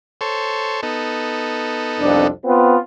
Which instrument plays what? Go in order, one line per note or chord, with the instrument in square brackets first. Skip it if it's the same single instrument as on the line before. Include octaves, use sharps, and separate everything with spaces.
[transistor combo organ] A4 C5 C#5
B3 D#4 A4
[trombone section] C2 F2 D4
B3 C4 F4